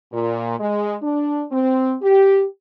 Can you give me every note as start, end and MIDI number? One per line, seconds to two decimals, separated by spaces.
0.12 0.58 46
0.59 0.95 56
1.01 1.44 62
1.51 1.95 60
2.01 2.44 67